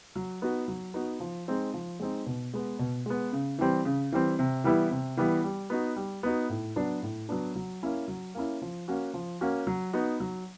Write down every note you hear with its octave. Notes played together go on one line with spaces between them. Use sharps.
F#3
B3 D#4 F#4
F#3
B3 D#4 F#4
F3
G#3 C4 D#4
F3
G#3 C4 D#4
B2
G#3 B3
B2
G#3 B3
C#3
E3 G3 C4
C#3
E3 G3 C4
C3
E3 G3 B3 E4
C3
E3 G3 B3 E4
G3
B3 D#4 F#4
G3
B3 D#4 F#4
A2
F#3 B3 D4
A2
F#3 B3 D4
F#3
A#3 C#4 E4
F#3
A#3 C#4 E4
F3
A#3 C#4 F#4
F3
A#3 C#4 F#4
F#3
B3 D#4 F#4
F#3